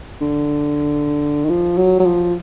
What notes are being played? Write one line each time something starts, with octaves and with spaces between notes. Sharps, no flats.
D3
D#3
F3
F#3
F#3
F3